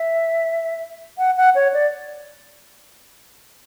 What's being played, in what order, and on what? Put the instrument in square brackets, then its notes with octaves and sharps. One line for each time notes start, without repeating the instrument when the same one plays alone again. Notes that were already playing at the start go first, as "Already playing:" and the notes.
Already playing: [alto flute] E5
F#5
F#5
C#5
D5